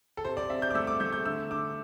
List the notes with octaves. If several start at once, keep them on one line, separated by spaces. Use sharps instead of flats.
A4
C3 C5
D5
C4 E5
G6
D6
A3 E6
D6
A3 G6
G6
D3 E6
D3 D6